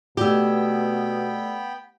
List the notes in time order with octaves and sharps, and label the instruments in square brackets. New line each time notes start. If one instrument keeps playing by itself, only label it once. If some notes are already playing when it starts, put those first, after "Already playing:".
[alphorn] B2 [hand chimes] A3 D5 E6 [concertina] B3 G5 B5 [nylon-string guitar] G4